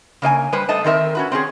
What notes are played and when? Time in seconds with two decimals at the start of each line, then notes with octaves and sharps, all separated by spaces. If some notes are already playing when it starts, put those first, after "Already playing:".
0.22 C#3 A#3 D#5 G#5
0.52 G3 B4 C5
0.69 G3 A3 D#5 A5
0.84 D#3 C4 A#4 E5
1.15 C#4 F#4 B4
1.32 C4 C#4 G#4